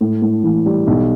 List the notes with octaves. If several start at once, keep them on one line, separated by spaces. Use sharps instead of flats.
A2
A2
E3
G3
B1